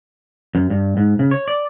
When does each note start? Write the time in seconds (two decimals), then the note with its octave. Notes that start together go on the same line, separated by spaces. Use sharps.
0.55 F#2
0.70 G2
0.97 G#2
1.19 C#3
1.31 C#5
1.48 D5